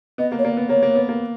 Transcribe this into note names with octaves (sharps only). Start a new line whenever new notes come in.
B3 D#5
A#3
C#5
A#3 D5
B3
A#3 C#5
A#3
B3
A#3